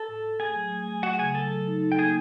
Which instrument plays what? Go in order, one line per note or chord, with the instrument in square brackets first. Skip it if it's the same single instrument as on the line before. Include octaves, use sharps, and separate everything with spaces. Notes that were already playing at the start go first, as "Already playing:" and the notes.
Already playing: [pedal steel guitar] A4 A5
[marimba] A2
A2
[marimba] A3 [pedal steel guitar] G#4 G#5
[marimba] F#3
A3
F#3
[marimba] A3 [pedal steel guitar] F#4 F#5
[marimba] C#3 [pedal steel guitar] G#4 G#5
[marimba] F#3 [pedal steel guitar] A4 A5
[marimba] F#3
D#4
D#4
[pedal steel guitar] G5
[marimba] A#3 [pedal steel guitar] G#4 G#5